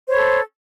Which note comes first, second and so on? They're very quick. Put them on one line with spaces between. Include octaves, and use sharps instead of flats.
C5 C#5 B5 A4